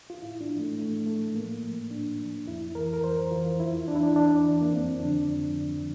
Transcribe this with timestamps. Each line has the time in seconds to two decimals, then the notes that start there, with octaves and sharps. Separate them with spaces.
0.10 F4
0.22 A2 E4
0.41 D4
0.50 F3
0.60 A3
0.78 A2 A3
1.06 F3 A3
1.34 A2 A#3
1.63 F3
1.91 A2 D4
2.19 F3
2.47 F2 E4
2.75 E3 A#4
2.93 A#4
3.04 F2 C5
3.31 E3 F4
3.60 E2 E4
3.88 E3 D4
3.95 E4
4.03 D4
4.16 E2 D4
4.44 E3
4.61 A#3
4.72 F2 C4
5.00 D3 F3 D4
5.29 F2
5.56 D3 F3